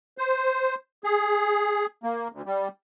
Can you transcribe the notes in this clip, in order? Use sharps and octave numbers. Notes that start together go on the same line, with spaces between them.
C5
G#4
A#3
D2
G3